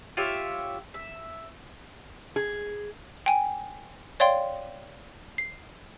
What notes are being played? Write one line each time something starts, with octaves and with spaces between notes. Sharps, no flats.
F4 G4 C#5 E5
E5
G#4
G5 G#5
C#5 D5 F5 G5 C6
C7